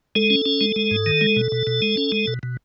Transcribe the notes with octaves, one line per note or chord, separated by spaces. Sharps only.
G#3 A4
C#4
C#4
G#3
G#3
G#2
D#3
G#3
B2
B2
B2
G#3
C#4
G#3
B2
B2